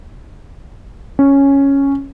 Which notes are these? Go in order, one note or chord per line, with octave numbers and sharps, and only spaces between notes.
C#4